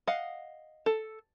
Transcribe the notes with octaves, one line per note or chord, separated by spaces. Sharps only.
D#5 F5 F#5
A4